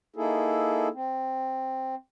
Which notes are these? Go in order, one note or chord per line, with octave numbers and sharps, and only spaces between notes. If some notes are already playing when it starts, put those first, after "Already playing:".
A#3 D#4 E4 G#4 A4
C4